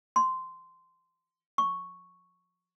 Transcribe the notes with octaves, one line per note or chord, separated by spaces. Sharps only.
C6
C#6